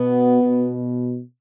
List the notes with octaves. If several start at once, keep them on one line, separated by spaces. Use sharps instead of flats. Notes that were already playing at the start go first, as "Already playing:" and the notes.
Already playing: B2 B3
B2